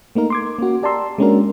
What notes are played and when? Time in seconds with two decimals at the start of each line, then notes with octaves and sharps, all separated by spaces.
0.15 A3 A#3 D#4 A#4
0.30 C6 D6 G#6
0.59 A#3 C#4 F#4
0.83 G4 D5 A5 A#5 C6 E6
1.18 G#3 A#3 C#4 D4 F#4 A#4